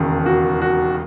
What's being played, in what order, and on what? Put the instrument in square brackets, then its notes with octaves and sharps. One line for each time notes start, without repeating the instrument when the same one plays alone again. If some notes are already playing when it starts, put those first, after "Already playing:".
Already playing: [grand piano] E1 D#2 C#3
F#4
F#4